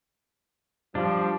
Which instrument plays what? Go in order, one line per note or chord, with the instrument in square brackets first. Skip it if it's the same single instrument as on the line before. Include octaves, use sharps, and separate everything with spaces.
[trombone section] F3 [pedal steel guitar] G3 D4